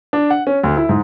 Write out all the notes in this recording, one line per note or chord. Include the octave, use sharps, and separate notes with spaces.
D4
F#5
C#4
D2
E4
G#2